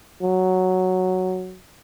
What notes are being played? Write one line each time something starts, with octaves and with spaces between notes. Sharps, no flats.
F#3